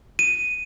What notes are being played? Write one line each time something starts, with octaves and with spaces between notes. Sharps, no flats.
D#7